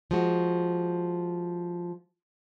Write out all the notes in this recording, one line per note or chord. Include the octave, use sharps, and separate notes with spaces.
F3 G#3 F#4